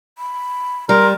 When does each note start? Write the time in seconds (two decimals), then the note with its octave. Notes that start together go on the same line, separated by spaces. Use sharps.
0.18 B5
0.89 G3 A#4 C6